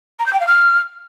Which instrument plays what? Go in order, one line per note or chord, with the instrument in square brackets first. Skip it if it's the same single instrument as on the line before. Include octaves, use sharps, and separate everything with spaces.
[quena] A#5
G6
G5
F5
F6